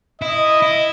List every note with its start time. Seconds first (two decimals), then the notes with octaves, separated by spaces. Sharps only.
0.22 E4 D#5
0.62 E4